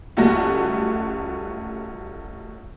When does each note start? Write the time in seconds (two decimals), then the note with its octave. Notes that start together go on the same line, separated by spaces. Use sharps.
0.17 C#2 F#2 G3 A3 F#4 A#6